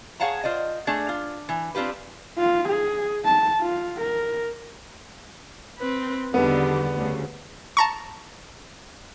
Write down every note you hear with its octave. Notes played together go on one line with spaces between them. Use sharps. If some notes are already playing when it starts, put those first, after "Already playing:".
G#4 C#5 F5 F#5 A5 A#5
F4 C5 D5 D#5
A3 D4 G#4
F4
E3
C4 D4 F4 G4 B4
F4
G#4
A5
F4
A#4
C4 B4
E2 D3 D#3 G3 B3
D2 C#3
A5 A#5 C#6